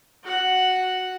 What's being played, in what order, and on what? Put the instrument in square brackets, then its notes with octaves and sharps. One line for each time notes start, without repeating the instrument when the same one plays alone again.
[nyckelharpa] F#4 F#5